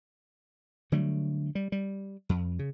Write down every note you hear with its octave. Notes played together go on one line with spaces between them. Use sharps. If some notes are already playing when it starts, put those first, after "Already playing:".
D3 F#3 G3 A3
G3
G3
F2
C#3